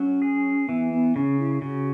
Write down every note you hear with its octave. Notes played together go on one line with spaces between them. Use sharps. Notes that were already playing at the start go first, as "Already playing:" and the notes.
Already playing: F#3 C#4
G#4
E3 B3
B3
C#3 C#4
E4
C#3 F#4